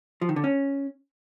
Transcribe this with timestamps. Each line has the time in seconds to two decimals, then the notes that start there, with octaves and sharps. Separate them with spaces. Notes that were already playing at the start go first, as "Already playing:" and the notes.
0.22 F3
0.29 D#3
0.36 D3
0.44 C#4